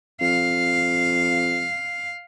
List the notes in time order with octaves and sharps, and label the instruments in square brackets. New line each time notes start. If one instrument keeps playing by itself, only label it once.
[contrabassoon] F2 [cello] F5